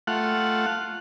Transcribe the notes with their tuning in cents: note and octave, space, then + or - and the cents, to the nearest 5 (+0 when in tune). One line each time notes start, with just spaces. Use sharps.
A3 +0 F4 -5 F#5 +0